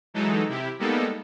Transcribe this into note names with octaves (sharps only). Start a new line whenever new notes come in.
E3 F#3 G#3 D#4 A4
C3 E4 G4
G3 G#3 A#3 B3 D#4 A4